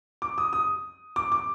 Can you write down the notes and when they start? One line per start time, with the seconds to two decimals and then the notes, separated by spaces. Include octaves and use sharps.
0.22 D6
0.38 D#6
0.53 D#6
1.16 D6
1.32 D6